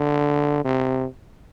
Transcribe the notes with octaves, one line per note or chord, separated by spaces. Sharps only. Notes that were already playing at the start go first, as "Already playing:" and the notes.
Already playing: D3
C3